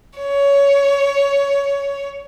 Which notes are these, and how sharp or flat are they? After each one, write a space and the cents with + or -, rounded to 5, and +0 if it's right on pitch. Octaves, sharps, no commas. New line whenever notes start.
C#5 +15